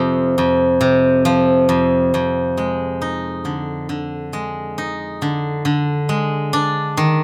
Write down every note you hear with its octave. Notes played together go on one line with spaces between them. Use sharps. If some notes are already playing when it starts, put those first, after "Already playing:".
Already playing: F2 C3 F3
F2
C3
F3
F2
F2
G#3
D#4
D3
D3
G#3
D#4
D3
D3
G#3
D4
D#3